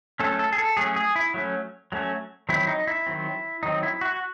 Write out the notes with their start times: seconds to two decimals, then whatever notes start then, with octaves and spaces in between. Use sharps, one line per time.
0.20 F#3 A3 C#4 A4
0.39 A4
0.52 G#4
0.58 A4
0.77 F#3 A3 C#4 G#4
0.96 G#4
1.16 E4
1.34 F#3 A3 C#4
1.92 F#3 A3 C#4
2.49 D#3 F#3 C4 E4
2.67 D#4
2.87 E4
3.07 D#3 F#3 C4
3.63 D#3 F#3 C4 D#4
3.83 E4
4.01 F#4